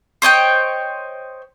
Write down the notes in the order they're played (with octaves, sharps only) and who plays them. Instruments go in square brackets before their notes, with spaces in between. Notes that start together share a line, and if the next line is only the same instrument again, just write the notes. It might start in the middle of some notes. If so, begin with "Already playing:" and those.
[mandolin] C5 C#5 D#5 G5